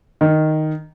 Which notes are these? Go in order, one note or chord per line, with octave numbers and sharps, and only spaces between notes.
D#3